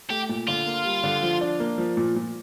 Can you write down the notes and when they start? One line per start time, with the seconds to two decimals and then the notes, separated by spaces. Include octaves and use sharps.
0.10 A3 G4
0.29 A#2
0.48 D3 F4
0.66 A#3
0.85 G3
1.04 D3
1.23 F3
1.41 D4
1.60 A#3
1.78 F3
1.97 A#2
2.16 A#2